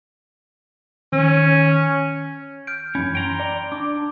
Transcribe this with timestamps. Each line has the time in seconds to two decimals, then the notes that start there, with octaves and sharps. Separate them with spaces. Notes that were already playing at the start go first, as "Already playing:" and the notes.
1.13 D#3 C#4
2.67 F6 G6 D7
2.95 F#2 E3 C#4 B5 G#6
3.15 G5 A#5 C6
3.40 D5
3.72 D4 D6